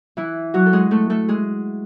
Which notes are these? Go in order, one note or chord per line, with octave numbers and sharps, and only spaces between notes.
E3 E4
F#3 F#4
A4
G#3 G#4
A3 A4
A3 A4
G#3 G#4